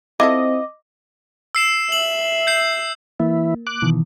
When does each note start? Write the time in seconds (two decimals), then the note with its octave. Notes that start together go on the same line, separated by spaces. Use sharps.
0.20 C4 E4 F4 A4 D#5 D6
1.55 E6 C7 E7
1.92 E5 F#7
2.47 G6 C7
3.20 E3 A#3 E4
3.67 D6 F#6
3.82 B2 D#3 E3